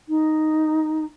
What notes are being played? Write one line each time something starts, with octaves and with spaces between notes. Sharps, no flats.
D#4